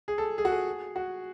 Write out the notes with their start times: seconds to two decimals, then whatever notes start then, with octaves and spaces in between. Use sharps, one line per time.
0.08 G#4
0.18 A4
0.38 G#4
0.45 F#4
0.52 G#4
0.96 F#4